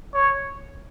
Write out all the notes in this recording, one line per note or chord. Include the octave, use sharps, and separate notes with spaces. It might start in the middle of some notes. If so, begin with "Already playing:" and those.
C#5